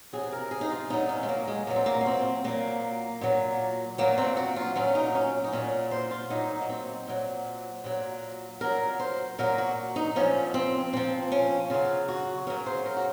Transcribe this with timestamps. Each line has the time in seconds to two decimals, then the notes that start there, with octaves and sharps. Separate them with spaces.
0.13 C3 F#3 G#4
0.32 A#4
0.51 G#4
0.61 D#4
0.71 F4
0.90 A#2 F#3 D#4
1.09 C#4
1.23 G#3
1.29 A#3
1.48 G#3
1.67 A#2 F#3 A#3
1.76 C4
1.86 A#3
2.01 C#4
2.06 C4
2.44 A#2 F#3 A#3
3.21 A#2 F#3
3.98 A#2 F#3 A#3
4.18 C4
4.37 F#4
4.56 F4
4.75 A#2 F#3 C#4
4.95 D#4
5.15 C#4
5.44 D#4
5.53 A#2 F#3 C#4
5.91 C5
6.11 F4
6.30 A#2 F#3 D#4
6.62 A#3
6.69 C4
7.07 A#2 F#3
7.84 A#2 F#3
8.61 A#2 F#3 A#4
9.00 C5
9.39 A#2 F#3 A#4
9.58 F#4
9.96 D#4
10.16 A#2 F3 C#4
10.54 C4
10.93 A#2 F3 C4
11.32 C#4
11.70 C#3 F#3 F4
12.08 F#4
12.47 C#3 F#3 A#4
12.66 C5
12.86 A#4
12.97 F#4